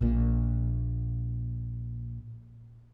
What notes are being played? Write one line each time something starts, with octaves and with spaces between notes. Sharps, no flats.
A#1 A#2